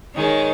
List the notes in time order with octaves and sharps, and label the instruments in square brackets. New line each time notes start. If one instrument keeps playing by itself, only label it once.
[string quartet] D#3 G#3 C#5